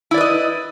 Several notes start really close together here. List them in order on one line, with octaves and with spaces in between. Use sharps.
E4 D5 B4 D#5